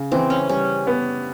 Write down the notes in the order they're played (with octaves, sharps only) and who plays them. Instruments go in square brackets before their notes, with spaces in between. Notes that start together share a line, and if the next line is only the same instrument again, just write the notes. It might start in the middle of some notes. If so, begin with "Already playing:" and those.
Already playing: [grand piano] C#3
[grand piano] E3 [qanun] C4
[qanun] C#4
[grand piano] G3 [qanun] C#4
[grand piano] B3